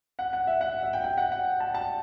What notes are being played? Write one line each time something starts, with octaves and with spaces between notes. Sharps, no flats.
F#5
F#5
E5
F#5
E5
G5
G5
F#5
F#5
A5
A5